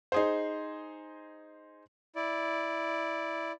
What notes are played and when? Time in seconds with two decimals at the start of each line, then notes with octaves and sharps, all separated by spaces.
0.12 D#4 G#4 C5
2.16 E4 D5